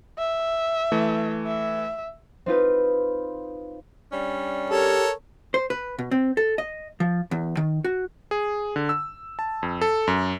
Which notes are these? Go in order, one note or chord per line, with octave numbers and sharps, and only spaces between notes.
E5
E3 A3
E5
C4 D#4 F4 B4
G3 C#4 D4
G4 A4 A#4 C#5
C5
B4
B2
C4
A4
D#5
F3
E2
D#3
F#4
G#4
D3
E6
A5
F2
A4
F#2